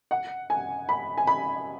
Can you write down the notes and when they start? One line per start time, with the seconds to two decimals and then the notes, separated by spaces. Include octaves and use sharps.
0.11 F#5
0.50 G#5
0.89 B5
1.18 G#5
1.27 B5